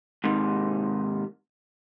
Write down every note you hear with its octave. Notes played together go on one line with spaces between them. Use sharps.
G#2 C3 D#3